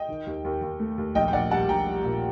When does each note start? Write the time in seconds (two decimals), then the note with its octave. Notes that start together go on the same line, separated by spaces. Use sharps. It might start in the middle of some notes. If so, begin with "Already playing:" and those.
Already playing: D#5 G5
0.08 D#3
0.26 D#2
0.44 D#2
0.62 D#2
0.79 A3
0.98 D#2
1.15 A#1 D#5 G5
1.28 G5
1.33 A#1 D5 F#5
1.51 G3 F#5 A5
1.69 A#1 G5 A#5
1.87 G3
2.04 A#2